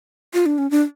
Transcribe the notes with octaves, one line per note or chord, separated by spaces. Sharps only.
F4
D4
C#4
D4